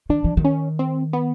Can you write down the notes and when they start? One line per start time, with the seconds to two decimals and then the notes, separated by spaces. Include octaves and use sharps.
0.09 D#3 D4
0.24 E3
0.37 D#3
0.45 C#4
0.79 C4
1.13 B3